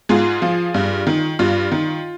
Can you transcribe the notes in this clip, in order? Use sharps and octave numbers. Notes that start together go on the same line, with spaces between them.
G#2 F4 G#4
F3
G2
D#3
G2 F4
D#3